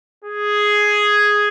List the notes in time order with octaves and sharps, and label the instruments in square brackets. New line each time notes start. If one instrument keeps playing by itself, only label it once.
[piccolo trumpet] G#4